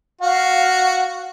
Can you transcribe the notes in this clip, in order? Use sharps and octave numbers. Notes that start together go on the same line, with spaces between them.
F#4 F5